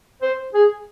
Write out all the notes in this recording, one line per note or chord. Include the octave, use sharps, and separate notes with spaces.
C5
G#4